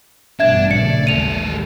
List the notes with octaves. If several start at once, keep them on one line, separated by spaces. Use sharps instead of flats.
A1 G2 B2 D4 E5 G#6
A#1 C#3 A3 D5 C#7
A1 D#2 G#3 A4 D#7 F7